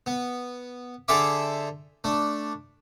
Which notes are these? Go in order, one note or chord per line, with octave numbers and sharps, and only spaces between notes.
B3
D3 G#4 A4 C5 E5 D6
A3 D4